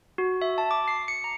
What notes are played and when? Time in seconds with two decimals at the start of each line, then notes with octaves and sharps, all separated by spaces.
0.18 F#4
0.42 E5
0.58 A5
0.71 D6
0.88 C7
1.08 C#7
1.24 A#5